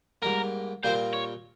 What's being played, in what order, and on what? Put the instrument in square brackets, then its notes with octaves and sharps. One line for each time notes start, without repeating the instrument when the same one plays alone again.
[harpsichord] G#2 G3 A#3 [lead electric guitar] A#4
[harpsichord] A#2 G3 C4 F4 A#4 [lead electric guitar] C5
[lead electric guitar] C#5